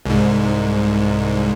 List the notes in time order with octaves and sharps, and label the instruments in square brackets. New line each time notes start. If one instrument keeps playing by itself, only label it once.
[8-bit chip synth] C2 G#2